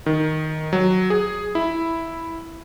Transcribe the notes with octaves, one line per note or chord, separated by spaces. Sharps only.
D#3
F#3
G#4
E4